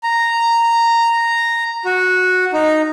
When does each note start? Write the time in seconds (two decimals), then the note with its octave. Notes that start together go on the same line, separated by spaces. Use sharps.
0.03 A#5
1.85 F#4
2.53 D#4